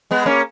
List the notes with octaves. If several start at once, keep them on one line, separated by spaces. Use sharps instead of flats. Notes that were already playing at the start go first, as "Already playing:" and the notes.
G#3 B3
A#3 C#4